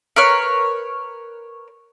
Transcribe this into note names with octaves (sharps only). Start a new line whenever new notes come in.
A#4 B4 C#5 F6